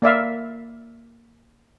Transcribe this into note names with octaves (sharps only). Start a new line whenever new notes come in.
A#3 D5 E5 F5